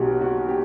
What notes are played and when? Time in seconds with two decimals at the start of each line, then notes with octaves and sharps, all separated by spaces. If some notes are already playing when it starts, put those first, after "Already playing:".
Already playing: B1 B2 F#3 F#4 G4
0.21 F#4
0.49 G4